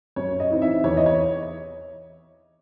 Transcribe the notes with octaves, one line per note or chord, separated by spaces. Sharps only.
F#2 C#5
D#5
E3 C4 D#4
E5
E2 C#5
D#5
C#5